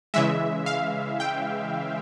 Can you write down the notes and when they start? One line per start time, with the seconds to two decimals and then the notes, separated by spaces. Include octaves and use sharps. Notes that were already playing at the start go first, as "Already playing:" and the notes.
0.14 C#3 E3 G#3 E5
0.66 F5
1.20 G5